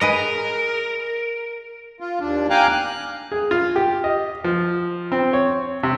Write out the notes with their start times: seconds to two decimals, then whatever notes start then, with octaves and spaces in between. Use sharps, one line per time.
0.01 G#4 A#4 B4 D#5
2.00 F4
2.20 D#2 D4
2.50 F5 G5 G#5 A#5 D6 F#6
2.72 F#6
3.32 G#4
3.51 F4
3.76 G4
4.04 D#5
4.44 F3
5.12 C4
5.33 C#5
5.83 C3